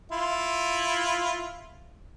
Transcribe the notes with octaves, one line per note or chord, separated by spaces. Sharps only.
E4 F4